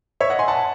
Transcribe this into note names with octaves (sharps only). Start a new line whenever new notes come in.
C#5 E5
D#5 F#5
G#5 C6
F#5 A5